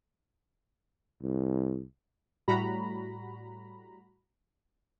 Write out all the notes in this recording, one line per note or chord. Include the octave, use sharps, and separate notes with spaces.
C2
A2 G3 F#4 A#5 B5